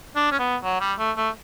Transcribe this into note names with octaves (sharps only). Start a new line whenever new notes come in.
D4
C#4
B3
F#3
G3
A3
A3